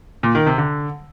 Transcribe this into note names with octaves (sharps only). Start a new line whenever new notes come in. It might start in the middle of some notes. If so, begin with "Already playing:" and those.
A#2
D#3
C3
D3